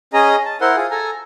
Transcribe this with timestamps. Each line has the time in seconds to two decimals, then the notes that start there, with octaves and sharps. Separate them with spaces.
0.13 C#4 G#4 D#5 A#5
0.45 A5
0.61 E4 A#4 C5 F#5 C6
0.76 F4 G#4
0.91 A4 G#5 A#5